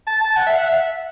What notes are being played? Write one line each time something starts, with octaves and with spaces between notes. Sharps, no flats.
A5
A5
F#5
E5
F#5
E5